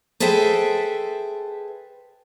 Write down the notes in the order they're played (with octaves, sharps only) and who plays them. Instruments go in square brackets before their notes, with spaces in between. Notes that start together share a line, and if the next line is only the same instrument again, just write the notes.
[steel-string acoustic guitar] G#4 A4 B4 C5 E5 G5